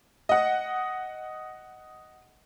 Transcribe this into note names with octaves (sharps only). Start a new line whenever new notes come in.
D#5 F#5